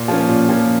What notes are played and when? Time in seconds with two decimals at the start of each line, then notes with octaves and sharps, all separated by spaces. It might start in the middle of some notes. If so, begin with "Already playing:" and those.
Already playing: A#2
0.08 F3 A#3 C#4
0.29 A#2
0.49 F3 A#3 C#4